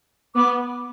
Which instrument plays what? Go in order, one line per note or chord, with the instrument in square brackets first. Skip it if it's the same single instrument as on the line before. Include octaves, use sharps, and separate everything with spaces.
[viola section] B3 [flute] D6